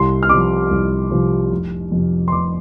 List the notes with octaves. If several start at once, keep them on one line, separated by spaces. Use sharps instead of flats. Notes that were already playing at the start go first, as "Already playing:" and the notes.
Already playing: C2 C6
F6
C3 F3 D6
C2
C3 F3
F1
F2 C3
C6
F1 D6